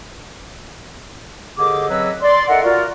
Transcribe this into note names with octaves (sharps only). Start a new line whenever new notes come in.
D#2 D3 G4 G#4 D#5 D6
C#3 F#3 C4 B4 D#5 E6
D5 C6
D#4 A4 A#4 D5 E5 F#5
F4 F#4 A#4 D5